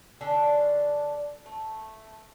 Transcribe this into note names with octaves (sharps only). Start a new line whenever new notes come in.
D3 C#4 D4 A4
A3